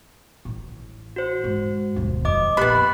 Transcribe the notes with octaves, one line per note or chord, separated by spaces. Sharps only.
A1
F#4 C5
G#2
E1 D#2
F2 D#5 D6
A#1 A#3 B3 G4 B5 F#6